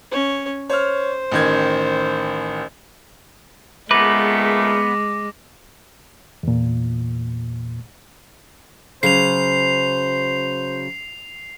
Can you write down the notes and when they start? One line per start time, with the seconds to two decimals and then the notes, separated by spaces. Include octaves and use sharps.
0.12 C#4 C#5
0.70 C5 C#5 F6
1.32 A1 D#3 G#6
3.91 A#2 C#3 G#3 A3 B3 B4 D6 A#6
6.43 E2 A#2
9.03 C#3 F#3 C5 C7 F7